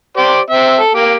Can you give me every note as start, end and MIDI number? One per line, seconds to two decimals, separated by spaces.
0.17 0.40 67
0.17 0.40 72
0.17 0.40 74
0.50 0.78 60
0.50 0.78 76
0.79 0.91 69
0.94 1.15 58
0.94 1.15 67